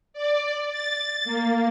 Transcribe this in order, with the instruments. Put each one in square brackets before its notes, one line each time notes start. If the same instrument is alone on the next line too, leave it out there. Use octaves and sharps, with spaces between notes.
[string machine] D5
A6
A#3